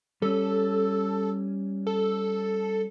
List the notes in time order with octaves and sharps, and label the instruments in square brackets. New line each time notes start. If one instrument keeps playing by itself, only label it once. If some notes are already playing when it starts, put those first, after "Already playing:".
[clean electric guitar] G3 C#4 [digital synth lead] A4
[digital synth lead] A4